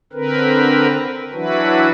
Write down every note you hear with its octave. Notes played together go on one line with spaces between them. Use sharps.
D3 C4 A#4 B4
E3 F#3 D4 E4 F#4 B4